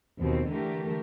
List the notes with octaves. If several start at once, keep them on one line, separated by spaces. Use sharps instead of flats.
D#2 B2 C4
D3 E3 A3 G4 A#4